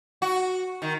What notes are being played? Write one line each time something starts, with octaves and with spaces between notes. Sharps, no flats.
F#4
D#3